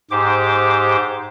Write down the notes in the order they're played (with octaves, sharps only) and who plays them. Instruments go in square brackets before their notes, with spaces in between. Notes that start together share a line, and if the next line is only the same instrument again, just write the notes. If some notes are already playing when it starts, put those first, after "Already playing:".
[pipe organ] G#2 G4 C5 D6